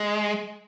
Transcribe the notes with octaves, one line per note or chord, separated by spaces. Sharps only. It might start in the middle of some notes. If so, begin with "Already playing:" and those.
Already playing: G#3